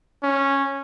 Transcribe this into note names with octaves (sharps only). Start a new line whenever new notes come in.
C#4